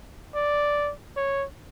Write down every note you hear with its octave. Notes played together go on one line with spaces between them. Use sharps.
D5
C#5